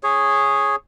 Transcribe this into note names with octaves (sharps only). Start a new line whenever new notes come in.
G#4 C#5